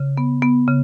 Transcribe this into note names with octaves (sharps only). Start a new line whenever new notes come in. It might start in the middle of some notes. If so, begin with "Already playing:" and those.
Already playing: C#3
B3
B3
C#3